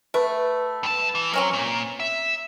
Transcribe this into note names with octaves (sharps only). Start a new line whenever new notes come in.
A3 B4
G2 A5
E3
F#3 C4 C#4 A#4
A#2
E5